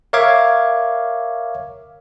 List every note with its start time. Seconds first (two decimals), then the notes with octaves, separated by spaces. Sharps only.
0.13 A#4 C#5 E5 F5 D6 G#6